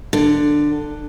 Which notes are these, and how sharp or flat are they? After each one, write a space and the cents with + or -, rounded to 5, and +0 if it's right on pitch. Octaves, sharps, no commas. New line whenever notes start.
D3 +10